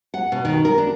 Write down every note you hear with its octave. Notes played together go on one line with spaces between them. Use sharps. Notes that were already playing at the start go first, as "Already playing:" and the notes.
F#5
B2
D#3
A#4
D4